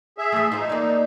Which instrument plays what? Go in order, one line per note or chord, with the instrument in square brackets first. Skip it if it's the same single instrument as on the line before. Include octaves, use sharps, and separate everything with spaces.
[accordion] G#4 E5
[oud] E3 A3
[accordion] D#4 [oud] F4 C5
[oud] A#3 D5